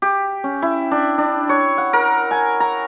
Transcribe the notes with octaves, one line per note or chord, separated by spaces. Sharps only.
G4
C#4
E4
D4
D4
C#5
F#5
A#4
G#5
A#5